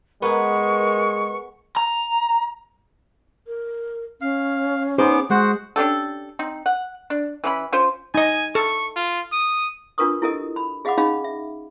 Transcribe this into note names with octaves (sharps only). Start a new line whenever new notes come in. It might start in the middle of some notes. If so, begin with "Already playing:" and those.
G#3 B3 G#4 A#4 B4 C#6
A#5
A#4
C#4 F5
B3 D#4 G#4 C5 D6
G#3 F#4 G#4 C5 F#5
C#4 D4 G4 A4
C4 D#4
F#5
D4
E3 C#4 B5
C#4 F4 C5
D#4 D#5 G#5
A4 C#6
F4
D#6
D4 F4 A#4 B4 C#6 D#6
E4 G4 A4 A#4 D#5
B5
G#4 D#5 F5 F#5 B5 D6
C#4 D#4 G#4 D#5 F5 B5
E5